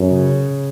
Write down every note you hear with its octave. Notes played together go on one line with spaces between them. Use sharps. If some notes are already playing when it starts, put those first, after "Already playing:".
Already playing: F#2
C#3